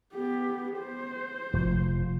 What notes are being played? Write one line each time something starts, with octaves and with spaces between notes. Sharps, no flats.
B3 G4
C5
F1 F3